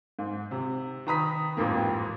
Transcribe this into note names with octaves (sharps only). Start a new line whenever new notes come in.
G#2
C3
D#3 B4 A#5 B5 D#6 B6
A1 F2 G#2 A#3